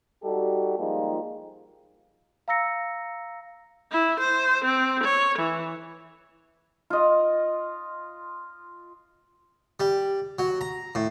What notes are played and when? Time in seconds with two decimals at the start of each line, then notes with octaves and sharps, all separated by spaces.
0.24 G3 D#4 F#4 G4 A4
0.79 F3 G3 G#3 A#3 D#4 F4
2.48 F5 A#5 E6 A#6 C#7
3.91 E4
4.20 C5
4.64 C4
5.04 C#5
5.39 E3
6.90 F4 D#5
9.80 G3
10.39 F#3
10.61 A#5
10.95 A2